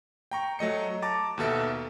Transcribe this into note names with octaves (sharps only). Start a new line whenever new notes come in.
G5 A#5 C#6
F#3 A3 D#5 C#7
A5 A#5 D6 A6
D#2 B2 A4 E5